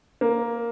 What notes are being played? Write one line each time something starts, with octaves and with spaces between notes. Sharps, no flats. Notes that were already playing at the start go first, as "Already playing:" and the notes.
A#3